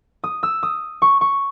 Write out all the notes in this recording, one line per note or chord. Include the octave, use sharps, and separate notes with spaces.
D#6
E6
D#6
C#6
C#6